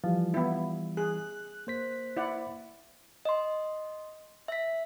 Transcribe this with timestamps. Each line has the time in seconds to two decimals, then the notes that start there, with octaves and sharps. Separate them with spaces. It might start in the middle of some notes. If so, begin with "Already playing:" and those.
0.04 E3 F3 G3
0.34 B3 E4
0.97 G#4 F#6
1.67 A#3 C5 B6
2.17 E4 D5 F#5
3.25 D#5 C6
4.48 E5 B6